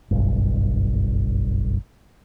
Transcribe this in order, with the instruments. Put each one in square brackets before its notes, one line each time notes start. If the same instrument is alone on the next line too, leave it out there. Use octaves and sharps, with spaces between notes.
[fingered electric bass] F#1 B1 G2